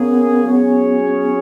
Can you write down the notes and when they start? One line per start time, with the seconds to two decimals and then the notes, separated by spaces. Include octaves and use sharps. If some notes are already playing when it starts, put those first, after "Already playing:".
Already playing: A#3 B3 C#4 G#4
0.44 F#3 C#4 G#4 C#5
1.23 B3